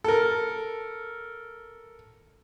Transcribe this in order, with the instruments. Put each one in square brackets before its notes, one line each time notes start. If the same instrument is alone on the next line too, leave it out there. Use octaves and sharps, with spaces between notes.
[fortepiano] A4 A#4